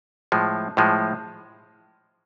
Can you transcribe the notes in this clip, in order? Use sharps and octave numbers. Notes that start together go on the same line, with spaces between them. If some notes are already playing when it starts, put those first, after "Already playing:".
A2 F3 G#3
A2 F3 G#3